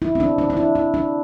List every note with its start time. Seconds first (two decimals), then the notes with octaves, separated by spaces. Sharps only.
0.02 E4
0.15 C4
0.20 D4
0.38 D4
0.50 D4
0.57 E4
0.75 E4
0.94 D4